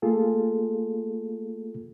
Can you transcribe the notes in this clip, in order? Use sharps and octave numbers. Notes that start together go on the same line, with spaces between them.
A3 A#3 F4 G#4 A4